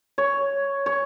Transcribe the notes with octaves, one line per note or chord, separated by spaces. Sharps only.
C#5
C#5